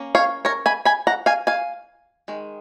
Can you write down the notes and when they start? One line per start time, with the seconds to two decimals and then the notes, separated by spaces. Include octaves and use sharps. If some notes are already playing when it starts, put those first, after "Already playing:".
Already playing: A#3 C#4
0.15 C#5 F5
0.45 A#4 C#5
0.66 G#5 B5
0.85 G#5 B5
1.07 F#5 A#5
1.26 F5 G#5
1.47 F5 G#5
2.28 D#3 G#3